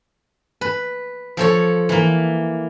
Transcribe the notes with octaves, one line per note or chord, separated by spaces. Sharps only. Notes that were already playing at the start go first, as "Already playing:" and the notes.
B4
F3 A4 C#5
E3 A#3